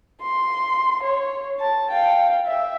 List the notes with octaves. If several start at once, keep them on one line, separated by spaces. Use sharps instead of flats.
C6
C#5
A5
F5 G5
E5